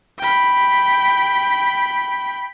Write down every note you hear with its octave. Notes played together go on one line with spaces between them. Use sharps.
G5 B5